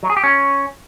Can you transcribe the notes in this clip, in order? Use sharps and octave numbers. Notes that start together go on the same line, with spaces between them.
F#3
G#4
G4
C#4